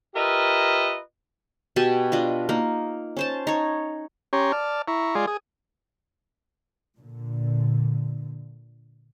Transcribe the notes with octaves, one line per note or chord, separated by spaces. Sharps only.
F4 G4 A#4 B4 D#5 E5
B2 G4 G#5 A5
D4 F4 D#5
A#3 D#4
C#4 C5 A5
D#4 C#5
C#4 G4 C#5 A#5 C6
D5 A5 F6
E4 A#5 C#6
G#3 F4 G#4 D5 C6
G#4 D#6
A#2 D3